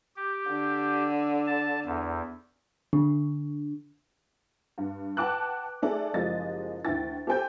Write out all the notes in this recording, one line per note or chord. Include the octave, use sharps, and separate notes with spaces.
G4
D3
A5
E2
D3
G2
B4 F#5 G5 A5 D6 F#6
A3 D#4 G#4 A4 D5
F#1 F3 G#3 G4 D#5 A6
D2 D#3 E4 G5 A6
G4 A4 C5 G5 G#5 G6